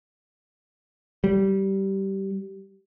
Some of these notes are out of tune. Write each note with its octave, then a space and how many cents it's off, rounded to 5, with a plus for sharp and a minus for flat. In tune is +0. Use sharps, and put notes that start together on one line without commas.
G3 -15